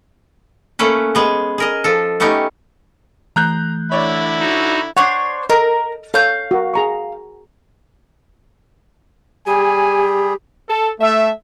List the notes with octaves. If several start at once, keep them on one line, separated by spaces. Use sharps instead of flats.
A3 A#3 C#4 B4
G#3 B3 G#4
G#4 A#4 D#5
F3 A4
A3 B3 C#4 D#4 G4
E3 A3 A#5 F#6 G6
D3 E4 C#5 D5 B5
D#4 F#4
D4 C5 C#5 F#5 C6
A4 A#4 D#5
A4 C#5 F5 G6
F#4 A#4
G#4 A#5 C#6
G3 G4 G#4 G#5
A4
A3 E5